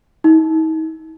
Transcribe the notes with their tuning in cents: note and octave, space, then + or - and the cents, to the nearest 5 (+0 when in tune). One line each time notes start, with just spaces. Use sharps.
D#4 +40